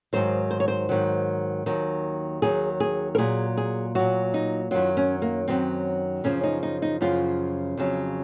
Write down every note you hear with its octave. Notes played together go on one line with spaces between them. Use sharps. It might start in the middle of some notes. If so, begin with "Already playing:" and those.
G#2 D#3 F#3 C5
C5
C#5
C5
G#2 D#3 F#3
D#2 D#3 F#3
D#2 D#3 F#3 G#4
G#4
A#4
A#2 F#3 G#4
G#4
A#2 F#3 F#4
D#4
F#2 D#3 F#3 F4
C#4
A#3
F#2 D#3 F#3 C4
F#2 C#3 F3 C#4
D#4
D#4
D#4
F#2 C#3 F3 F4
F2 C#3 F#3